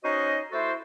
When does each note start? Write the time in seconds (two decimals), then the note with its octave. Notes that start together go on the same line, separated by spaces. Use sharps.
0.03 C#4 D#4 F#4 C5 D#5
0.52 A3 E4 F#4 A4 C5